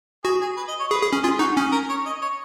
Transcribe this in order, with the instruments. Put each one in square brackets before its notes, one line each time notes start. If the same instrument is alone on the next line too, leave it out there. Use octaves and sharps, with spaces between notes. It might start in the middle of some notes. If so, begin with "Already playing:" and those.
[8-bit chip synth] F#4 [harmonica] G#4
[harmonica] G#4
B4
D#5
C#5
[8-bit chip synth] G#4 [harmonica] B4
[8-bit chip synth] G#4
C#4
[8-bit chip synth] F4 [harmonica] G#4
[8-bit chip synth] D#4 [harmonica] F#4
[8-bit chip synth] C#4 [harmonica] G#4
[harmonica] A#4
C#5
D#5
C#5